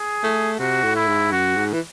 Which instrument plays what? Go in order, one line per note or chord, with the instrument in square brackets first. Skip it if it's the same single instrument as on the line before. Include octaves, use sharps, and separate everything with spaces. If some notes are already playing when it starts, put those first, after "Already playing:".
Already playing: [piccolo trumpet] G#4
[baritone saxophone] A3
[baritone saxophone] C3 [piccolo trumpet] F#4
[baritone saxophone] A2
[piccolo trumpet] E4
[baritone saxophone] G#2
[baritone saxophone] F#2 [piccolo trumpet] F#4
[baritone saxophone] G#2
E3